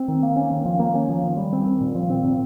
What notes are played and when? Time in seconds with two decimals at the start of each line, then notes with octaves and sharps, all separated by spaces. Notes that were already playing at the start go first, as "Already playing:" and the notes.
Already playing: C4
0.08 D#3
0.23 A#3
0.36 C#4
0.51 D#3
0.65 F3
0.79 A#3
0.95 C#4
1.09 F3
1.24 D#3
1.37 G3
1.53 C4
1.66 D#3
1.81 A#2
1.95 F3
2.10 C4
2.24 A#2